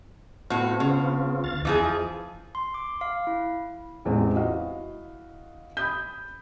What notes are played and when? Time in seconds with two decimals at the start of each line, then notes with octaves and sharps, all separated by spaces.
0.50 A2 B3 C4 F4 F#4
0.80 C#3
1.44 D2 F5 A6
1.65 E2 E3 F3 G#4 D#5
2.55 C6
2.74 D6
3.01 F5
3.27 E4
4.05 A1 E2 G#3 C4 G#4
4.35 E4 F#4 D#5 F5
5.77 B5 D#6 G6